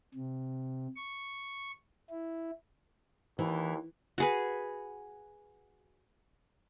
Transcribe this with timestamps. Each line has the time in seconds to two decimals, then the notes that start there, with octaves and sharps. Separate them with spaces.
0.15 C3
0.96 C#6
2.10 E4
3.39 D#2 E3
4.18 F#4 G#4 B4